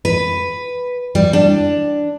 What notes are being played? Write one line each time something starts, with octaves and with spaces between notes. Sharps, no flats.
B4
G3
D4